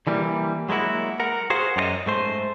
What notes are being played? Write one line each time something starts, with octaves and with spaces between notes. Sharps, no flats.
D3 E3 G3 A#3
F#3 G#3 A#3 E4 F#4
A#4 F#5
F#4 G#4 A#4 C5 F5 F#5
F#2 G4 D#5
G#2 A3 C5